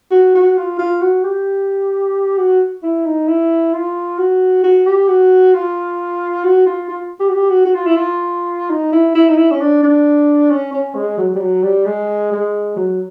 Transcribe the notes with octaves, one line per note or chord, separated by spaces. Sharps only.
F#4
F#4
F4
F4
F#4
G4
F#4
E4
D#4
E4
F4
F#4
F#4
G4
F#4
F4
F#4
F4
F4
G4
F#4
G4
F#4
F#4
F4
E4
F4
D#4
E4
E4
D#4
E4
C#4
D4
D4
C#4
C#4
G#3
F#3
G3
F#3
G3
G#3
G#3
F#3